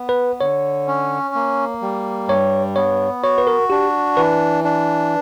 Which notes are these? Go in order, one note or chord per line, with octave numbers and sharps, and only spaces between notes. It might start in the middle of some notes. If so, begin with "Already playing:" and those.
Already playing: B3
B4
D3 C#5
C#4
A#3
G3
G2 C#5
B3 C#5
F#4 C#5
B4
A#4
D4 G4
E3 B4
D4